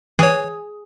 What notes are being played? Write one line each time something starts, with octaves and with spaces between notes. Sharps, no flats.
E3 G#4 C#5